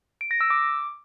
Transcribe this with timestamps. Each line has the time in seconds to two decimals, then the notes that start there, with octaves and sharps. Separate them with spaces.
0.21 D7
0.31 A#6
0.41 E6
0.50 D6